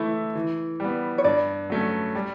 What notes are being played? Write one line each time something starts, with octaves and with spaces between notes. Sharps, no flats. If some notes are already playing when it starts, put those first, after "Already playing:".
Already playing: E3 A3 E4
E3
G3 B3
C#5
G2 D5
F#3 A3 C#4
G3